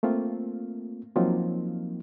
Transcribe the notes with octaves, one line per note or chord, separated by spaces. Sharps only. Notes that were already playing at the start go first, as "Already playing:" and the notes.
A3 A#3 C4 F4
F3 F#3 A#3 C4 D#4 F4